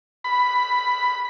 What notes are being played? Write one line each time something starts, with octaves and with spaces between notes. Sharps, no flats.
B5